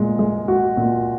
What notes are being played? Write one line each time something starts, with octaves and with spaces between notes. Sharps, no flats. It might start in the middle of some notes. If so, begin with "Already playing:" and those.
Already playing: A#2 G#3
G#3
F#4
A#2